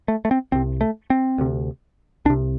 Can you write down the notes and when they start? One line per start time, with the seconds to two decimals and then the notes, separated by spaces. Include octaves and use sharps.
0.08 A3
0.25 A3
0.31 C4
0.52 C2 C3 C4
0.81 A3
1.10 C4
1.38 D2 C3
2.25 C2 D4
2.30 C3